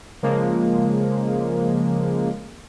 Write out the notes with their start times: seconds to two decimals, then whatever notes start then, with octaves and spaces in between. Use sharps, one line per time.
0.23 C#3 F3 G#3 A#3